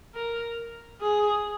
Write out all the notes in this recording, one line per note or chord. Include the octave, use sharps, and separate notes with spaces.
A#4
G#4